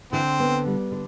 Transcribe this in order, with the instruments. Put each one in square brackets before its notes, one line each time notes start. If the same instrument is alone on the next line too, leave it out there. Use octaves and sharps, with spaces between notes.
[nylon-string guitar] D3 [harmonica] E3 C4
[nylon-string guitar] B3
G3
D3